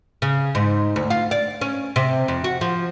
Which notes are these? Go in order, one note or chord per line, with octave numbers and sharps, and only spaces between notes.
C#3
G#2
D2
F4
D5
C#4
C3
F2
F#4
F3